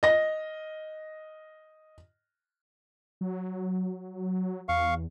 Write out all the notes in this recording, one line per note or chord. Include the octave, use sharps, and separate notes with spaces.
D#5 A#6
F#3
E2 F5 C#6